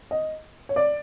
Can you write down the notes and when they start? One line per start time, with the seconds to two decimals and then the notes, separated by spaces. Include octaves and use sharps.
0.11 D#5
0.69 C#5
0.76 D5